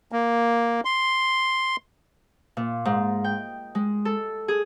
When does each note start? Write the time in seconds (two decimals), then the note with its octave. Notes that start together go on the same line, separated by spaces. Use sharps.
0.12 A#3
0.85 C6
2.57 A#2
2.85 G#2
3.24 G5
3.75 G#3
4.05 A4
4.48 G#4